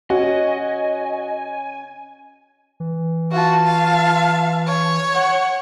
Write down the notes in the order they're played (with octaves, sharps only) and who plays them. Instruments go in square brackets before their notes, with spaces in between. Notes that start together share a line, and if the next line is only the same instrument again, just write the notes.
[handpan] C#4 [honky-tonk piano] F#4 [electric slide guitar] D#5 [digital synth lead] G#5
[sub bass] E3
[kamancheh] F4 A5 [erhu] F#4
[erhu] F5
C#5
[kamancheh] F#5